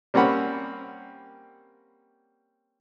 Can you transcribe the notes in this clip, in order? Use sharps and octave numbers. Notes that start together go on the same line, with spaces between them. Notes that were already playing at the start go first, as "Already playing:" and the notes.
G3 A#3 C4 C#4 F#5 B5